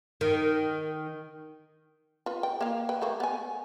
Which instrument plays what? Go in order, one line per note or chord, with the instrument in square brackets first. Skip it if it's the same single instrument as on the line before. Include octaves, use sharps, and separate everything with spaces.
[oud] D#3
[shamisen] F4 B4
G5
A#3 F5
B4 G5
A3 A#3
B3 G#5